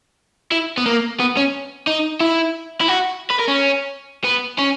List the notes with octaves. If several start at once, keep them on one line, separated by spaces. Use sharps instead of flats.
E4
B3
A#3
B3
C#4
D#4
E4
E4
F#4
B4
A#4
C#4
B3
C#4